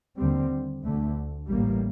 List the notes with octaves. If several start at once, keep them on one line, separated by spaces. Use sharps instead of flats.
D#2 D3 G3 C4
D2 D3 A3
A1 A2 G3 A#3